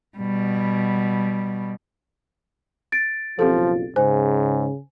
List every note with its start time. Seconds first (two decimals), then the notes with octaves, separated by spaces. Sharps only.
0.17 B2 G3
2.92 A6 D7
3.39 F#1 B1 F3 C4 F4 G4 A4
3.96 G#2 C#3 C5 G#5